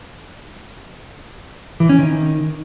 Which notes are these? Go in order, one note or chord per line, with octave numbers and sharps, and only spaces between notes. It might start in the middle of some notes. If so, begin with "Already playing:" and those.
E3
C#4
D#3